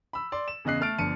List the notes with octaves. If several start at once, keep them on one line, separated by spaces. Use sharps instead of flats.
B5 E6
D5 C6
E7
E2 C#3 D#5 F#6 C7
A3 A4 F6 A6 D7
G1 F3 D4 C#7 D#7